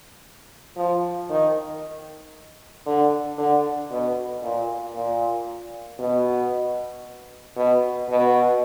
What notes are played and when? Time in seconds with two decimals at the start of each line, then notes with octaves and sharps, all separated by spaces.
0.77 F3
1.30 D#3
2.86 D3
3.38 D3
3.91 B2
4.43 A#2
4.95 A#2
5.99 B2
7.56 B2
8.09 B2